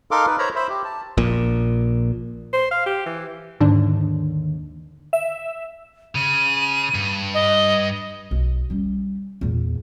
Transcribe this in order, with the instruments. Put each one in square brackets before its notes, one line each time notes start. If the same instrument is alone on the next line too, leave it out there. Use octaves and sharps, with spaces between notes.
[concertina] D#4 A4 A#4 F5 C6 D6
D#4 B4
A#4 C5 C#5 A#5 B5
C5 E5 B5
G4
A5
[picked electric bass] A#1 A#2
[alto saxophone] C5
F5
G4
E3
[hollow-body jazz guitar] D#2 D3 [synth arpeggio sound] G#2 D4
[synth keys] E5
[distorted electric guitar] C#3 [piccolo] D#7
[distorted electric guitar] G2
[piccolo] D#5
[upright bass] B1
G3 C#4
E2 A#2